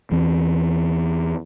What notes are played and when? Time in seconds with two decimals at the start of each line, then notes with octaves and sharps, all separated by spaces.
0.12 E2 E3 C4